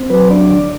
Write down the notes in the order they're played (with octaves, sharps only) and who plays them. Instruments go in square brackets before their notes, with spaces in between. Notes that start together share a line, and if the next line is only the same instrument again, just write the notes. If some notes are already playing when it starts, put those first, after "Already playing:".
Already playing: [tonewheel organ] C4
F#3 B4
D4 D5
D3 D5